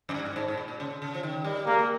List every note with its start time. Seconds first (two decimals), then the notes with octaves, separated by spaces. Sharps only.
0.09 F2
0.14 G2
0.36 G#2
0.48 G#2
0.57 A#2
0.68 A#2
0.80 C#3
1.02 C#3
1.15 F3
1.23 D#3
1.44 G3
1.66 G#3 A#3
1.79 G#3